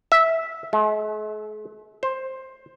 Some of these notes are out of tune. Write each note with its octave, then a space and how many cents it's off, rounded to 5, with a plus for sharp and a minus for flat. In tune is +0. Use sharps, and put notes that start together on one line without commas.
E5 -10
G#3 +45
C5 +10